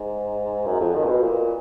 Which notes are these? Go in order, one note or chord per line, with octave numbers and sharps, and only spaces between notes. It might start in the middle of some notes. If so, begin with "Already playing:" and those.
Already playing: G#2
F#2
F2
D#3
A#2
B2
A#2